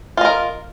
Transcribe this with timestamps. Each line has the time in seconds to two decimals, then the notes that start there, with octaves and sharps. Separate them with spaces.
0.17 F4
0.21 D#5
0.25 A#4